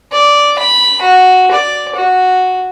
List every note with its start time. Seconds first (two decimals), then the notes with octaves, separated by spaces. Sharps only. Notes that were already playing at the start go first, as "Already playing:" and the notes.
0.12 D5
0.59 B5
1.02 F#4
1.52 D5
1.96 F#4